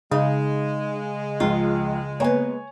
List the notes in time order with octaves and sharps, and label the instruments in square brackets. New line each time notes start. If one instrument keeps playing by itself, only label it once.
[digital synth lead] C#3 [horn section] G#3 [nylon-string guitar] D#4
[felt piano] C#2 F3 [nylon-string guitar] F4
[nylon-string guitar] A#3 B3 [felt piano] C#5 G#5